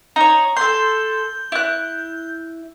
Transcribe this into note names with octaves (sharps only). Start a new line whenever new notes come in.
D#4 C#5 A#5
A4 C6 G6
E4 F#6